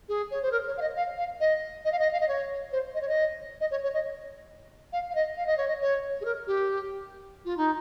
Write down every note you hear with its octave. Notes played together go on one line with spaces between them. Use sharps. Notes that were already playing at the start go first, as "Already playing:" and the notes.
G#4
C#5
C5
A#4
C#5
F5
D#5
F5
F5
D#5
D#5
F5
D#5
F5
D#5
C#5
C5
D#5
C#5
D#5
D#5
C#5
C#5
D#5
F5
F5
D#5
F5
D#5
C#5
D#5
C#5
G#4
A#4
G4
F4
D#4